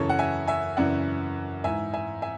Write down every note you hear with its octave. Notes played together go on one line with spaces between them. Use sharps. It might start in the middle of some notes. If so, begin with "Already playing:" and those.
Already playing: F#2 C#3 E3 A4 C#5
F#5
E5 G#5
E5 G#5
F#2 C#3 E3 D5 F#5
G#2 E3 E5 G#5
E5 G#5
E5 G#5